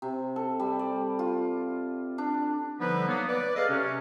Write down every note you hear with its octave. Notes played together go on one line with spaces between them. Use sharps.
C3
A4
G3
D5
F4
D4
D3 F3 G3 B3 D#4 B4
F#3 A#3 B3
B4 D5
G#4 A4 B4 D5 D#5 F5
C3 C#4